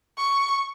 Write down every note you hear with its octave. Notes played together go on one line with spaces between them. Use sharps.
C#6